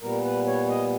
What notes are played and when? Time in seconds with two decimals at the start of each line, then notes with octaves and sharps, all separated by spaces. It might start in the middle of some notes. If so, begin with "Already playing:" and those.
0.02 A#2 G3 B3 A#4
0.25 B4
0.46 C#5
0.69 D#5